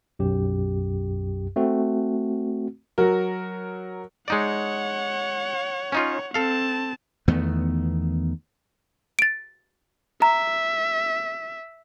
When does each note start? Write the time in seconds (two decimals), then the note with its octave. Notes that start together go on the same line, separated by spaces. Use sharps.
0.19 B1 F#2 G4
1.56 A3 C4 F#4
2.98 F#3 F#4 A#4
4.28 G#3 D#4 C#5 D5 F#5
5.92 C#4 D#4 F4
6.34 C4 A4 F5 A5
7.28 E2 D#3 A3 B3
9.19 A6 D7
10.22 E5 A#5